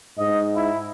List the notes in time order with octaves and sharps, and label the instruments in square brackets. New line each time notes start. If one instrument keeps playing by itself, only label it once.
[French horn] G#2 [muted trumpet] D#5
[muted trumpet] E4